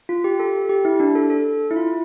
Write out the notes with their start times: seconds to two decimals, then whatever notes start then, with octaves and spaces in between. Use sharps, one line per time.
0.09 F4
0.24 G4
0.40 A4
0.69 G4
0.85 E4
1.00 D4
1.15 A4
1.30 A4
1.70 E4
1.76 F4